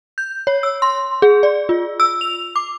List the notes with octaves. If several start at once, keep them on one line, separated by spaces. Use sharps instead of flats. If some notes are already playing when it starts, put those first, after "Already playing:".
G6
C#5
E6
C6
G#4
D5
F4
E6
F7
D6